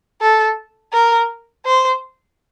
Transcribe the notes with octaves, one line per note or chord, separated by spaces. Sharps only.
A4
A#4
C5